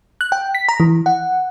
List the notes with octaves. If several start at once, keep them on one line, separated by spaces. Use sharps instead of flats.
F#6
G5
B6
A#5
E3
F#5